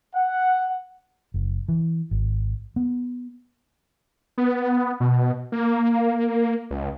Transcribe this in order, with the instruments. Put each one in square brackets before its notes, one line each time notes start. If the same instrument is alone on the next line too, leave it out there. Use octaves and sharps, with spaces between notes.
[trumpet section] F#5
[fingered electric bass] F#1
E3
G#1
B3
[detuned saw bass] B3
B2
A#3
C#2